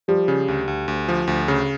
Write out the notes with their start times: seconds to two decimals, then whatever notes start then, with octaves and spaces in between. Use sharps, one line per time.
0.08 F3 G3
0.28 C#3
0.48 D2
0.68 D2
0.88 D2
1.09 F3
1.28 D2
1.48 C#3